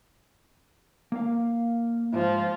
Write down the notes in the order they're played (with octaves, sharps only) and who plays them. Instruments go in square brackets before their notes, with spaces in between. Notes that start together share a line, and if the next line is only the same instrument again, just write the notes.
[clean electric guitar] A#3 A#4 F5
[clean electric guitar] G#2 [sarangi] F3